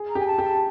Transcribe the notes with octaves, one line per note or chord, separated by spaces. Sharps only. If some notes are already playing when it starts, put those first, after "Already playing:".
Already playing: G#4
A#5
G4 G#5
A5
G4
A5